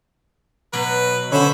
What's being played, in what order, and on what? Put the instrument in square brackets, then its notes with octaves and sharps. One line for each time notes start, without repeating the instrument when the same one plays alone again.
[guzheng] B2 F#3 [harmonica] B4
[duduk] D3 [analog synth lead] C#4 [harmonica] C5 E5 B5